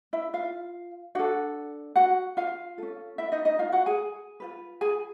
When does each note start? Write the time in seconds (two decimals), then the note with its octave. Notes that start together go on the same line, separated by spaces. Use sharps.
0.13 E4 E5
0.33 F4 F5
1.15 D4 F#4 F#5
1.19 A4
1.96 F#4 F#5
2.37 F4 F5
2.78 C#4 F4 A4
3.18 E4 E5
3.32 D#4 D#5
3.45 D#4 D#5
3.59 F4 F5
3.72 F#4 F#5
3.86 G#4 G#5
4.40 F4 G#4 B4
4.81 G#4 G#5